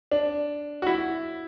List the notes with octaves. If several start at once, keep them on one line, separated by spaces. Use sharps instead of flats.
D4
F#4
E4